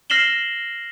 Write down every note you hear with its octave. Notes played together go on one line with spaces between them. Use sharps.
F6 A#6 C7 E7 F#7 G7